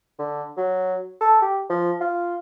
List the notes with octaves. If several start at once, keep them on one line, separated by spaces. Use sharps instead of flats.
D3
F#3
A4
G4
F3
F4